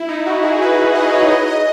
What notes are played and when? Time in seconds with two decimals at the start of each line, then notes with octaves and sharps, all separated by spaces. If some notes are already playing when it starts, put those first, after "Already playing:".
Already playing: E4
0.09 D#4
0.26 F#4
0.43 G#4
0.62 B4
0.95 D#5
1.13 C#5
1.31 D#5
1.48 D#5